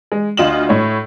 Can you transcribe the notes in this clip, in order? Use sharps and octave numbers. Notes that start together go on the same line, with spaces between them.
G#3
D2 F4 D#5 E7 F#7
A2 C#5